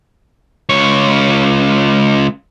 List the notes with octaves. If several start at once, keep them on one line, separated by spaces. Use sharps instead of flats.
C#2 C#5